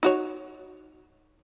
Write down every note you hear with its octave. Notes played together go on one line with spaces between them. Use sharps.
D#4 F#4 C#5